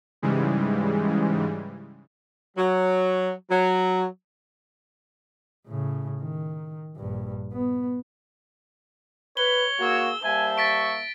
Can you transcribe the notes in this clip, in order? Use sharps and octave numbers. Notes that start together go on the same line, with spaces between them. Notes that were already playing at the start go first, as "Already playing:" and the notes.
G#2 C#3 E3 G3 G#3
F#3
F#3
A2 C#3
D#3
A#1 G2
B3
B4 C#5 G7
A#3 F#4 G#4 E6
G3 A#3 C5 E5 G#5 A5
C#6 A6 B6 D7